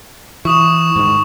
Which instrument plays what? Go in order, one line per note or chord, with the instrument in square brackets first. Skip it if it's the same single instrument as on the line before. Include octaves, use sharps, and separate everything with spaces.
[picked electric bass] E3 [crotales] C#6 D#6 E7
[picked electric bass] G#2 D#3